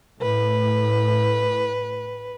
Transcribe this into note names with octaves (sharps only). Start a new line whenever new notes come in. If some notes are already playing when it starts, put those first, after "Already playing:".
A2 B4